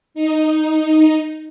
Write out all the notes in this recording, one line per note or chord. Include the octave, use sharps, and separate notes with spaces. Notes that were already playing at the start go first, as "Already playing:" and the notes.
D#4